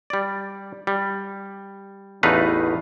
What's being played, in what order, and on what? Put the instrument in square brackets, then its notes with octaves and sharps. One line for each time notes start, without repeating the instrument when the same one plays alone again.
[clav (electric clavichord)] G3 D5
G3
A1 E2 A3 D#4 B4 F5